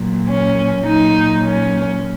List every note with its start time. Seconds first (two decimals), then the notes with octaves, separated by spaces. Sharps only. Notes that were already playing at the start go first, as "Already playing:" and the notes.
Already playing: A#2 F#3
0.27 C#4
0.85 A#2 F#3 D#4
1.44 C#4